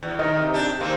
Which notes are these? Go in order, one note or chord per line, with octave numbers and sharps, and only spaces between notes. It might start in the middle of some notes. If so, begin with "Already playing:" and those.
E2
D#3 A#4 D#5
C3
D4 G4
D#3 G3 G#3 A#3 C4